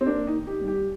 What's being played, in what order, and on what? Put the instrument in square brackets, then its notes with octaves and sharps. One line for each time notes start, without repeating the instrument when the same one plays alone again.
[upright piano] C4
A#3 D4
D#4
D#3
G4
G2
G4